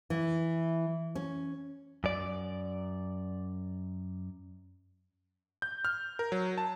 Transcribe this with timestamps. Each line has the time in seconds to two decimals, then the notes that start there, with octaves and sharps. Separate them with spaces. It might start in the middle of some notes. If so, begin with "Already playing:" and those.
0.10 E3
1.15 C#4
2.04 F#2 D5
5.62 G6
5.85 F6
6.19 A#4
6.32 F#3
6.58 A5